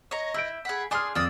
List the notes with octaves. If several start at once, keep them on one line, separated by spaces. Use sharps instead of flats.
C#5 D#5 A#5
E4 E6 G6 D7
G#4 F#5 B5
D4 G#4 G#5 C6 D#6 F6
F2 A#3 D5 D#6 E6